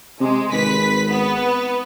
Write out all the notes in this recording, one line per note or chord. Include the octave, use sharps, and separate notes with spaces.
C3 G#3
G#1 B4 B6
B3 B4